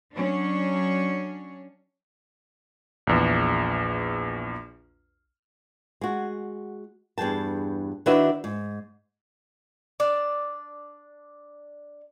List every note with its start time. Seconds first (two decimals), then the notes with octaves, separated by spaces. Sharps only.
0.13 F#3 C#4 D4 C#5
3.07 A#1 E2
6.01 G#3 F#4
7.18 E2 G2 G#4 G5 A5
8.06 D#3 D4 E4 F#4 B4 E5
8.44 G#2
10.00 D4 D5